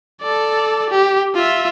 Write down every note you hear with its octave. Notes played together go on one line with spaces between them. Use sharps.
A4 D5
G4
F4 E5